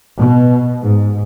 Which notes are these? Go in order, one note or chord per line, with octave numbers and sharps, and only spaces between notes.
B2
G#2